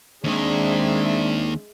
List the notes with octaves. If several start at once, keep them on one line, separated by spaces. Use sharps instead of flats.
D#2 D#3 G#3 C4 D4 E5